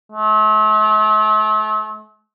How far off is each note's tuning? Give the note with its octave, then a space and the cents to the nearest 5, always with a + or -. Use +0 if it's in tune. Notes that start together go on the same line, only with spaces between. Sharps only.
A3 -40